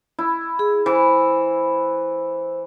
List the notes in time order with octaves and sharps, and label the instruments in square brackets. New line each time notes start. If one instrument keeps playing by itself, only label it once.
[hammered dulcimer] E4
[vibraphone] G#4
[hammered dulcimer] E3 [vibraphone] C5